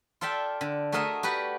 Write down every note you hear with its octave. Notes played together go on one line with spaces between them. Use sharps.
F4 A4 D5 E5 G5
D3
A3 F#4 G#4 A#4 D#5 E5
F#4 G4 B4 D5